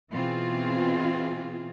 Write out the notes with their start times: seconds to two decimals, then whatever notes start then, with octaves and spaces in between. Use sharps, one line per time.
0.10 B2 E3 C4 F4 G#4